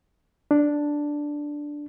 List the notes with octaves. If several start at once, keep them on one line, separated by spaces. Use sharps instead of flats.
D4